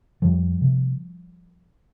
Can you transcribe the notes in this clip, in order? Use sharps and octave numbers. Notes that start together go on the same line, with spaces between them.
F2 F3 G3
C3